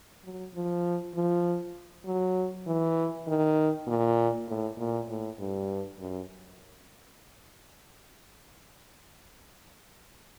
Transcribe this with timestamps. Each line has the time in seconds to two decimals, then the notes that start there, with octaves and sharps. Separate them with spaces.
0.24 F#3
0.55 F3
1.16 F3
2.07 F#3
2.67 E3
3.28 D#3
3.87 A#2
4.48 A2
4.78 A#2
5.08 A2
5.39 G2
5.99 F#2